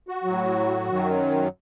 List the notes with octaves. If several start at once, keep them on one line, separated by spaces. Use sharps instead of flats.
F#4
A2 F#3
F#2 D#3 F#3